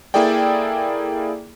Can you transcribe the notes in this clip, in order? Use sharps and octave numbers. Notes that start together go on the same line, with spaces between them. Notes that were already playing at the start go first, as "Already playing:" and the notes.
A#3 E4 G#4 A4 D5 G5